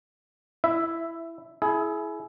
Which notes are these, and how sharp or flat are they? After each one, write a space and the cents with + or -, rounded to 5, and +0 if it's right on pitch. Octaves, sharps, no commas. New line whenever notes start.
E4 +10 E5 +0
E4 +0 G#4 +30